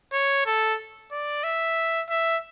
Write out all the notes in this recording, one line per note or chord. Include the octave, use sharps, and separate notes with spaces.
C#5
A4
D5
E5
E5